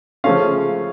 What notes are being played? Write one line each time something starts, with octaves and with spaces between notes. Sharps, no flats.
C#3 F3 A3 C#4 F5